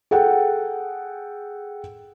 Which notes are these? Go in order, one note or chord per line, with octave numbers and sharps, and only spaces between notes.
G#4 A4 F#5 G5